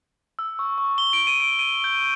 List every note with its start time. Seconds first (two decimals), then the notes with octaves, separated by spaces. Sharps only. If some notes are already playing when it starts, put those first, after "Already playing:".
0.39 E6
0.59 C#6
0.78 C#6
0.98 G7
1.13 D7
1.27 D#7
1.40 D7
1.59 D#7
1.84 G6